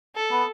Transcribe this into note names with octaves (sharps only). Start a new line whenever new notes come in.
A4
B3